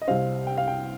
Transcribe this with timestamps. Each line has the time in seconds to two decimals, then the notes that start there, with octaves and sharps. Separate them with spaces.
0.02 D#5
0.07 C2 C3 G3 C4 F5
0.47 G5
0.57 F5
0.68 G5